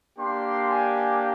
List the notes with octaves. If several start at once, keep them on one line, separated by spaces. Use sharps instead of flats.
A#3 D4 G4 C6
G#5